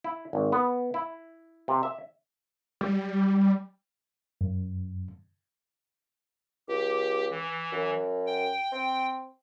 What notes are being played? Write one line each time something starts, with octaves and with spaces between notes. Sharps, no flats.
E4
G#1
B3
E4
C3
E5
G3
F#2
C#2 G4
E3
F#2
G5
C4